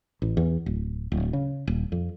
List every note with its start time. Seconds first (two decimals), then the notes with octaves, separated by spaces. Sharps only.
0.22 A1
0.37 E2
0.66 D1
1.12 D1
1.33 C#3
1.67 D#1
1.92 F2